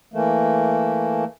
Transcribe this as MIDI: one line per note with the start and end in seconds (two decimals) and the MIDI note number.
0.14 1.24 52
0.14 1.24 57
0.14 1.24 58